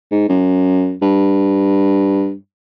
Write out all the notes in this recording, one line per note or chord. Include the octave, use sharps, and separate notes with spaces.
G#2
F#2
G2